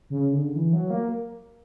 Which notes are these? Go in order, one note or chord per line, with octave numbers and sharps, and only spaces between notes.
C#3
D3
E3
F#3
A#3